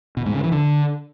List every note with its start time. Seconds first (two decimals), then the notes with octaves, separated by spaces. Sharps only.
0.17 B2
0.26 G#2
0.34 C#3
0.43 E3
0.52 D3